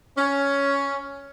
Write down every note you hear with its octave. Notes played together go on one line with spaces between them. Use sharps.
C#4